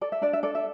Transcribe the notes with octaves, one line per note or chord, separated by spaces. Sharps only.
A4 D5
E5
D4 D5
E5
A4 D5
E5